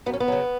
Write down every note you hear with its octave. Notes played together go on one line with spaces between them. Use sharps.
F#2 B3
C#4
B3
C#3 F#3